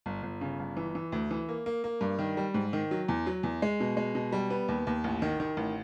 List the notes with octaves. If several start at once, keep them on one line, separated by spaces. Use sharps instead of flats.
G1
G1
C#3
G1
E3
E3
D2
E3
A#3
A#3
A#3
G2
D#3
G3
G#2
D#3
F#3
E2
F#3
E2
G#3
B2
G#3
B2
G3
B3
D#2
D#2
A1
D#3
D#3
A1